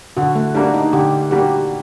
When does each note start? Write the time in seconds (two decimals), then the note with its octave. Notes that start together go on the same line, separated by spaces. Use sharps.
0.17 D3 F#4
0.35 A3
0.54 G3 A#3 D4 F#4
0.74 D#4
0.93 D3 G4
1.31 G3 A#3 F#4 G4